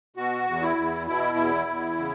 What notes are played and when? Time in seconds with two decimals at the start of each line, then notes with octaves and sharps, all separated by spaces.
0.16 B2 F#4
0.47 E2
0.62 E4
0.77 E2
1.07 B2 E4
1.37 E2
1.67 E2
1.98 C#3